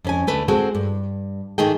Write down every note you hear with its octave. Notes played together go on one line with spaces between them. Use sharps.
F2 C#4 G#5
D2 A3 B4
G#3 C4 F#4 G#4 A4
G2
G#2 D#3 A3 D#4 G#4 G5